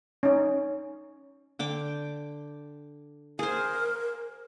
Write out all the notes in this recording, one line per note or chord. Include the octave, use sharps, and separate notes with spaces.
C#4 D#4
D3 G5 D6
G#4 A#4 C5